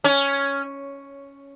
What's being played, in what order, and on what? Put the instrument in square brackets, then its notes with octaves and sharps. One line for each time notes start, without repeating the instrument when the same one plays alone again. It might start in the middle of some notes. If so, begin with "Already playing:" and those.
[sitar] C#4